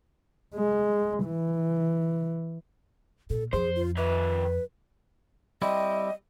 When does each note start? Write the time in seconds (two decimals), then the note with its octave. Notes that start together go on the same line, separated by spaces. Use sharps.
0.55 G#3
1.25 E3
3.30 A#2 A4
3.53 F2 G#4 C5
3.76 F4
3.97 D#3 B4 E5
5.62 G3 C4 E4 D#5